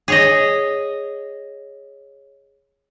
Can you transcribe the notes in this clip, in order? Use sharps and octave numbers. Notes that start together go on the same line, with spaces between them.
G#4 C#5 D#5